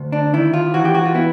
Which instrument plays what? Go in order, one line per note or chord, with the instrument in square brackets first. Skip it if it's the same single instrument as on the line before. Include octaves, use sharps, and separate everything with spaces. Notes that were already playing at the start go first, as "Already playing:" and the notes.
Already playing: [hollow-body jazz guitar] D2
D4
D#3 E4
F4
E3 F#4
G4
F#4
F4
B3 E4